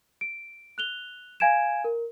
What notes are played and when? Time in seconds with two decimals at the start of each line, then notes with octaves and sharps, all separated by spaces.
0.21 D7
0.78 F#6 F7 G7
1.40 F5 G#5 G#6 D7 E7
1.84 A#4